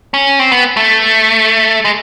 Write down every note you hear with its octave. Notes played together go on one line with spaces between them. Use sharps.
C#4
C4
B3
A3
G#3